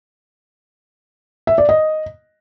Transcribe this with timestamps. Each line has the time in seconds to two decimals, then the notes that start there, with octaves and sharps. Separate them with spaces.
1.47 E5
1.58 D5
1.69 D#5